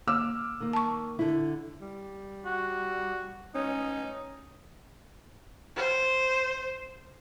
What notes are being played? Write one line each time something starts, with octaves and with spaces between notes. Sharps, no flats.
A#3 D6 E6 F6
D#3 A#3
A5 C#6
D3 E4
G3
F#4
C#4 D#4
C5